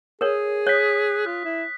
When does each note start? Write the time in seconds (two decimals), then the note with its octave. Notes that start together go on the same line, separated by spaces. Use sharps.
0.21 G#4 A#4 C#5 D#6
0.67 C#5 F#6 B6
1.27 F4 F#6
1.45 E4